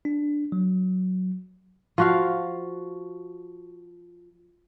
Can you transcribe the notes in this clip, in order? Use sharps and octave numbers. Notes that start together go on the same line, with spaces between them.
D4
F#3
F3 F#4 F5